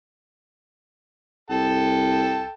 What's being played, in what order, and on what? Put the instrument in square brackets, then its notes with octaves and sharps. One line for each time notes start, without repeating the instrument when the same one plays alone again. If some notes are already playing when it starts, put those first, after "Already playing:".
[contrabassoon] C2 [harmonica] A4 G5 A5